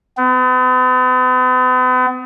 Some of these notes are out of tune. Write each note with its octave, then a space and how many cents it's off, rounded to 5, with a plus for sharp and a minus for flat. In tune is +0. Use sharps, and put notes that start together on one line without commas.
B3 +45